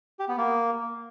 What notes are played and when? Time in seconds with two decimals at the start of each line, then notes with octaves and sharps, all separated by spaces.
0.19 G4
0.28 B3
0.38 A#3